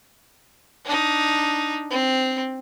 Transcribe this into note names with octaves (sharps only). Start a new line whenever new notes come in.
D4 D#4
C4